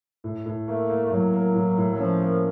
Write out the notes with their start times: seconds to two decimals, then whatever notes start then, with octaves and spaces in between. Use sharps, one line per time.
0.24 A2
0.46 A2
0.67 A3 A#3
0.89 A#3
1.04 A3
1.11 A2 F#3
1.34 A#3
1.55 A2
1.78 A2
1.92 F#3
1.99 F3 C#4
2.21 A#3